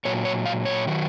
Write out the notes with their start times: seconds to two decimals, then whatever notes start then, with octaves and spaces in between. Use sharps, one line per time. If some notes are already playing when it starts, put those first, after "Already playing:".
0.05 A#2 F#3 C#5
0.25 C#5
0.45 F5
0.65 C#5
0.87 D#3 F#3